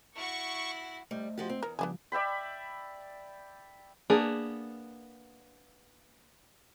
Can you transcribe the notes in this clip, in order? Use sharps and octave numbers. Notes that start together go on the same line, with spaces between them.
E4 F#4 C#6
G3 A3 C5 D#5
F3 F#4 G4
C4
E2 A#4
C#2 F3 G3 B3 D4 G#4
D5 E5 G5 B5
A#3 B3 D4 G#4